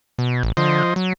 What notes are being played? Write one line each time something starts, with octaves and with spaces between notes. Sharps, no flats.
B2
A1
D3 F3 C5 D#5
F#3